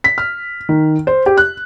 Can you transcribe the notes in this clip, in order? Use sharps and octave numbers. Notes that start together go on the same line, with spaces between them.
B6
F6
D#3
C5
G4
F#6